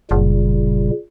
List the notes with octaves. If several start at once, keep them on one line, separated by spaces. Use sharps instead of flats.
F#1 A#2 C#3 G3